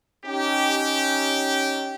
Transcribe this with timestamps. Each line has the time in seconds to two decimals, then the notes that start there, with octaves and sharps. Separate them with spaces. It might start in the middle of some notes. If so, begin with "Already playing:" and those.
0.25 C#4 D#4 G4